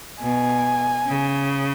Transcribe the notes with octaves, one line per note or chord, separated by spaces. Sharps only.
B2 G#5
C#3